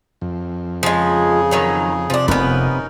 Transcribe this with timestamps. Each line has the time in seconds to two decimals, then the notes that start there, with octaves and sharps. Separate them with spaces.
0.21 F2
0.83 C#3 F3 G#3 G#4
1.51 D#3 F#3 D#4
2.10 C3 F3 D4
2.28 F1 F2 B3 C#4 D#4 A#4 B4